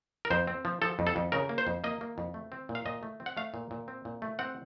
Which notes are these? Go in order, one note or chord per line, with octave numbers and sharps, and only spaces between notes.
A#4
F2 C5
C4
F3
F3 A4
F2
A4
F2
C#3 A#4
A#3
C5
F2
A#3 D#5
A#3
F2
A3
C4
A#2
F5
A#2 D#5
A3
C4
F#5
A3 F5
A#2
A#2
C4
A#2
A3
C4 F#5